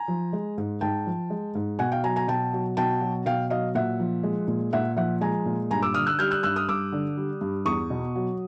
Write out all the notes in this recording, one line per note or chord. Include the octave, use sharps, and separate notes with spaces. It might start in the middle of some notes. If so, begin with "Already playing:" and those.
Already playing: G#5 A#5
F3
G#3
G#2
G#2 G5 A5
F3
G#3
G#2
B2 F#5 G#5
F5 G5
F#3 G#5 A#5
G#5 A#5
B2 G5 A5
F#3
B2 G5 A5
F#3
B2 F5 G5
F#3 D#5 F5
A#2 E5 F#5
F3
G#3
A#2
A#2 E5 F#5
F3 E5 F#5
G#3 G#5 A#5
A#2
G2 G#5 A#5
D6 E6
D3 D#6 F6
E6 F#6
G3 F6 G6
E6 F#6
G2 E6 F#6
D#6 F6
G2 D6 E6
D3
G3
G2
E2 C#6 D#6
B2
F#3